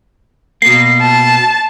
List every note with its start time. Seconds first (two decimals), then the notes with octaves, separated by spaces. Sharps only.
0.62 B2 A#3 C7
1.01 A5